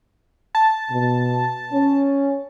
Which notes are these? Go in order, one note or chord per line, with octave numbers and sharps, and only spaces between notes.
A5
B2
C#4